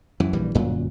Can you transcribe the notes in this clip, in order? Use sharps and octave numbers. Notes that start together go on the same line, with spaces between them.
F#2 E3
A#1 E3 G3
G1 F#2 A#2 F#3